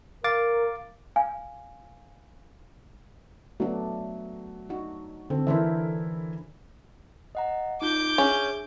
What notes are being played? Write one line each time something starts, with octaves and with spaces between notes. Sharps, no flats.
A#4 F5 D6 A6
F5 G#5
F#3 A3 B3 D4
D4 D#4 F#4
D3 C4 A4
E3 D4 E4 A#4 C5 E5
D#5 F#5 A#5
D#4 F4 D6 G6
C#4 D4 G#4 E5